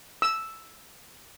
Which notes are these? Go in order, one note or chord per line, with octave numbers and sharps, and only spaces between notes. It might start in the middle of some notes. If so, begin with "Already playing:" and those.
E6